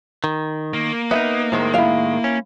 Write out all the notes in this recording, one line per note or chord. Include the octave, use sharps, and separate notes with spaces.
D#3
A#3
B3 C#4 D#4 E5
A2 D#3 G#3 C5
E4 F5
C#4